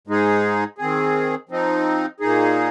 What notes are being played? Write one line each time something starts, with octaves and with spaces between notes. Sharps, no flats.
G#2 G#3 D#4 G#4
D#3 C4 G#4
F3 C4 D#4
A#2 A#3 D#4 G#4